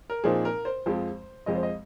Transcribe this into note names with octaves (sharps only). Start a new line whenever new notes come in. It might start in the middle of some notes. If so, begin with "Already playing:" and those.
A#4
A#2 F3 C4 D#4 G#4
A#4
C5
F2 F3 G#3 C4
F2 F3 G#3 C4 D#5
C5
D#5